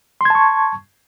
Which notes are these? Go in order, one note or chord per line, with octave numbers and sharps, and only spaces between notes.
A5 C6 C#6 G#6